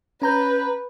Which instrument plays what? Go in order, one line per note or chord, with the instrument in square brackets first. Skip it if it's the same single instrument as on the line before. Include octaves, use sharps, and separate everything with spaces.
[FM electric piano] C#4 A#5 G6 [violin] B4